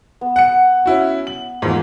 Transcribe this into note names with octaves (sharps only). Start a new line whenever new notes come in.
B3
F#5 C#7
C#4 E4 F#4
F#7
E2 G#2 F3 A#3